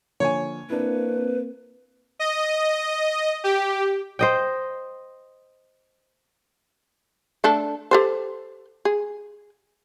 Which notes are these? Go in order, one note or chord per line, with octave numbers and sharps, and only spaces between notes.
D3 F3 A#3 C#5 G#5
A#3 C4 D4 E4 B4
D#5
G4
C5 D#5 G5
A3 D4 A4
G4 A4 C5
G#4